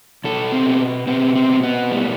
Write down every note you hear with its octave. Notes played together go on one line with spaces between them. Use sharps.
B2 A4
C4
B2
B2 C4
C4
B2
B3
A2 G3